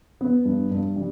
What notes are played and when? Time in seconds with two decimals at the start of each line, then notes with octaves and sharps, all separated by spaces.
0.21 B3
0.45 G2
0.71 G2
0.96 G3